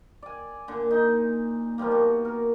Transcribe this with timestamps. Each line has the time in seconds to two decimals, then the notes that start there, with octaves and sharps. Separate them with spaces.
0.22 D5 G#5
0.68 A#2 D3
0.91 D#4
1.78 B2 F3 G3 A#3
1.91 F#4
2.25 A#4